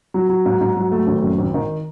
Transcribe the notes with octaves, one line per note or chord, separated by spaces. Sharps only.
F#3
F#3
G#2
G#2
F#3
A3
G#1
F#2
G#1
D#3